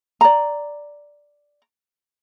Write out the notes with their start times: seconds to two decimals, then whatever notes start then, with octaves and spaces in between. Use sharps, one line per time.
0.21 D5 A#5